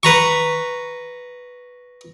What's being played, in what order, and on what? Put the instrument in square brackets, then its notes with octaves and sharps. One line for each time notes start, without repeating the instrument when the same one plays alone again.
[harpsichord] B4 A#5 C#6